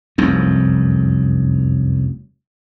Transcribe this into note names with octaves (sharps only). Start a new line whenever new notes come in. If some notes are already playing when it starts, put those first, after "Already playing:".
F1 C2 F#2